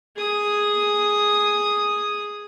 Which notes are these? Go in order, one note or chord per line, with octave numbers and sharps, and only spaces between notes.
G#4 D#6